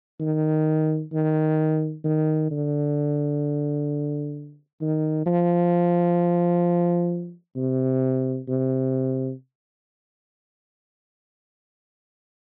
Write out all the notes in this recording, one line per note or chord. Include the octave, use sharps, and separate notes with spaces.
D#3
D#3
D#3
D3
D#3
F3
C3
C3